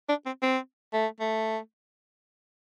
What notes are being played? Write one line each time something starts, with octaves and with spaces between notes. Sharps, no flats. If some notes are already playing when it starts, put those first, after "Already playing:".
D4
C4
C4
A3
A3